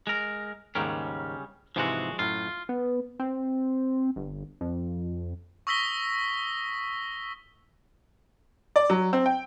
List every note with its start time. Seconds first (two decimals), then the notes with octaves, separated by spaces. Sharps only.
0.07 G#3 A#4
0.75 D#2 G#2 C#3 G3 C#4 A#4
1.76 G#2 C3 E3 F3 G#3 F#4
2.19 F#2 A2 F4
2.69 B3
3.19 C4
4.16 G1
4.61 F2
5.67 C#6 D#6 E6 A#6 B6 G7
8.76 D5
8.90 F#3
9.13 C4
9.26 G5